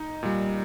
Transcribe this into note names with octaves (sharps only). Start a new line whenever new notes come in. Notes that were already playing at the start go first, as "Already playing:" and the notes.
Already playing: D#4
A#2 G3